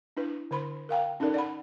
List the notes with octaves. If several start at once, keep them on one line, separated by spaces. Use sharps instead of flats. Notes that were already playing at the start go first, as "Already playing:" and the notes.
D4 E4 B4
D3 C5 B5 C6
A#4 F5 G5 A#5
C#4 D#4 A4 A#4 D5
D5 F#5 B5